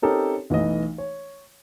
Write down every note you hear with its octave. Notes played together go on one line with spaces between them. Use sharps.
C4 C#4 D#4 G4 A4 A#4
B1 E3 A3 D#5
C#5